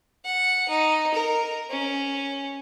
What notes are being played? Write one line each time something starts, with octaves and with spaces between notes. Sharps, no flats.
F#5
D#4
A#4
C#4